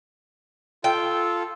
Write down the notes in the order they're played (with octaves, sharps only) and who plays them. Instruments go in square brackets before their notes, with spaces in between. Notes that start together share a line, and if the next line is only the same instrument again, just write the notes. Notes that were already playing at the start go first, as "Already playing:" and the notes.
[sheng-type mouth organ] F4 A4 [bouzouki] G5